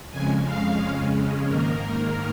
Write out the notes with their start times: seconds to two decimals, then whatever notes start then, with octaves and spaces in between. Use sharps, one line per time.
0.11 F2 C#3 G#3 G#5
0.45 F5
0.79 F2 C#3 G#3 C#4
1.46 G#2 D#3 A#3 A#4